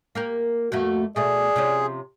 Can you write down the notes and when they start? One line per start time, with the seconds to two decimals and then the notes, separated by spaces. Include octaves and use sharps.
0.15 A#3 G4 A#4
0.72 F2 A3 A#3 F#4
1.16 B2 A3 G#4 D5
1.56 C3 F3 C#4